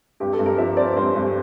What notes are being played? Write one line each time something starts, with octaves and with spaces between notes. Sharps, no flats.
G2 G4
A4
G2
A#4
F3 E5
C4 D5
G2 C5
G2